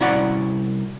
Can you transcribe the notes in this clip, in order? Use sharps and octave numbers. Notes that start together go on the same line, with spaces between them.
C2 C#4 E4 F#4 D5 F#5